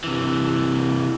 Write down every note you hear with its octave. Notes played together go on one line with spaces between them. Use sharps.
C3 E3